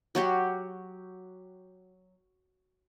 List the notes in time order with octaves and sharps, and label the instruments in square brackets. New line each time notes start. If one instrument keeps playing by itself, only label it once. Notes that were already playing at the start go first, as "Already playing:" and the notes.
[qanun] F#3 F#4 G4